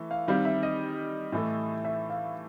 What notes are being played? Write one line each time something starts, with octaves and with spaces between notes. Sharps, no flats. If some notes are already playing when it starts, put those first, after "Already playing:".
Already playing: E3 A3
F5
D#3 G3 C4 F5
E5
D#5
A2 E3 A3
E5
F5